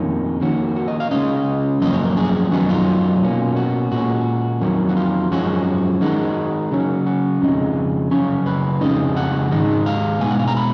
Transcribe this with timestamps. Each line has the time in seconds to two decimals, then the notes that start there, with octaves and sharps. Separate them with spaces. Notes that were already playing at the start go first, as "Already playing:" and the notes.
Already playing: F2 D#3 A#3 C#4
0.41 D#3 A#3 C#4 F#4
0.76 F#4
0.88 D#5
1.00 F5
1.11 C#3 G#3 C#4 D#5
1.82 F#2 F3 A#3 C#4 D#5
1.93 C#5
2.05 A#4
2.17 G#4
2.51 F#2 D#3 F#3 B3 D#4 F#4
2.69 F4
3.21 B2 A#3 C#4
3.56 F#4
3.92 A#2 G#3 C#4 F#4
4.61 F2 D#3 F#3 A#3 C#4
4.89 F#4
4.97 F4
5.31 F#2 F3 G#3 C#4 F#4
6.01 D#3 G#3 D#4 F#4
6.72 C#3 F#3 C#4
7.06 F#4
7.42 F2 C#3 G#3 D#4
8.11 F#2 C#3 F#3 C#4 C#5
8.46 B4
8.81 F2 C#3 G#3 D#4 D#5
9.16 F#5
9.51 G#2 D#3 G#3 D#4
9.86 F5
10.21 B2 G#3 B3 G#5
10.30 F#5
10.39 F5
10.48 A#5
10.57 B5